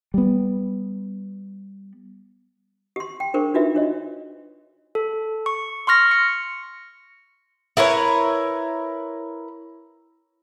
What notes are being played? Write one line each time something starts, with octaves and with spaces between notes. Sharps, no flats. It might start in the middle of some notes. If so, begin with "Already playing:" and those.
G3 B3
G4 C6
G5
D4 G#4 A#4 C5 C#6
D4 D#4 F4 F#4 B4 E5
D4 C#5 D#5
A4
C#6
C6 C#6 F6 A#6
C#7
E4 A#4 B4 C#5